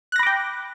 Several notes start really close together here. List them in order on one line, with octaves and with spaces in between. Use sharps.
F#6 A#6 B5 D6 G5